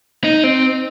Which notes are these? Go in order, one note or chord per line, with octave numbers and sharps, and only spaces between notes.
D#4
C4